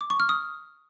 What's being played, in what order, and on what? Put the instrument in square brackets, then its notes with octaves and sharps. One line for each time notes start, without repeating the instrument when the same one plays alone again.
[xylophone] D6
C#6
F6
D#6